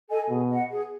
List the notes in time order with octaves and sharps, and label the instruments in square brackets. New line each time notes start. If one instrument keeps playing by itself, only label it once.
[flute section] A4 D#5 G#5
[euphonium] B2 [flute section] G#4
[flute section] D#5 F#5
G#4